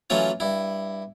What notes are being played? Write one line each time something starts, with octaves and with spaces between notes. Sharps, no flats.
E3 F#3 A3 C#4 F4 C#5
G2 E4